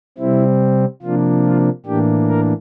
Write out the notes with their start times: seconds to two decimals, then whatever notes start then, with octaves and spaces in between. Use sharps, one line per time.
0.18 C3 G3 C4 E4
1.02 C3 F3 A#3 D4 F4
1.45 F4
1.86 A2 E3 A#3 D4 G4
2.28 A#4